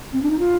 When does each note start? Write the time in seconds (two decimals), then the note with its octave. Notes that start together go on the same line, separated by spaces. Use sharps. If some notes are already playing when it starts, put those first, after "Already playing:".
0.13 C4
0.23 D4
0.30 D#4
0.39 F4